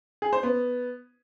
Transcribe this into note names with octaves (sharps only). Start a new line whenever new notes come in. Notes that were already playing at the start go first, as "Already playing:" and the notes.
G#4
C5
B3